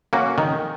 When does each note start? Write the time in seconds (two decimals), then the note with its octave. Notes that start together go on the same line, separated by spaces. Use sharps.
0.13 A#3 C#4 F#4
0.38 D#3